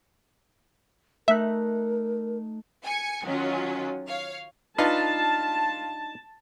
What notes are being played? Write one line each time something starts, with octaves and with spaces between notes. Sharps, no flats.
A3 D#4 A#4 E5 F#6
G#5 C#7
D#3 F#3 C#4 F4
C#5 F5
D4 D#4 F4 B4 A5